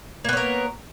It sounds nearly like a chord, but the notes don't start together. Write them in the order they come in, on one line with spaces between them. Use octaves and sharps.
A#3 B3 C#5 A#4